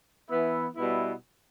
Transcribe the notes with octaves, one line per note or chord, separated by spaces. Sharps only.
E3 B3 E4
B2 G3 B3 E4